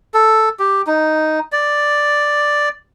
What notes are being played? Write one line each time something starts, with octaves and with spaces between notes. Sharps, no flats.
A4
G4
D#4
D5